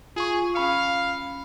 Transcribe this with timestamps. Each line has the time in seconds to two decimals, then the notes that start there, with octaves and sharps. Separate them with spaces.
0.16 F4 G#4 C#6
0.55 C#4 F5 B5 C#7